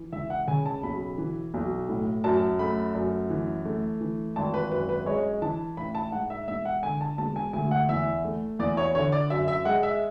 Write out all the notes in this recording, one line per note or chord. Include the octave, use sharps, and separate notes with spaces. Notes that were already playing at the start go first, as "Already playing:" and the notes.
Already playing: E3
C#2 E5
F#5
C#3 G#5
A5
B1 B5
E3
B1
A2
F#2 A5
A3 B5
F#2
E3
A3
E3
G#1 A5
B4
F#2 B4
B4
G#3 C#5
E3 A5
A1 B5
A5
G#2 F#5
E5
E1 E5
F#5
D3 G#5
A5
E1 A5
G#5
D2 G#5
F#5
E2 E5
A3
E2 D5
C#5
D3 C#5
D5
F#2 E5
E5
G#3 F#5
E5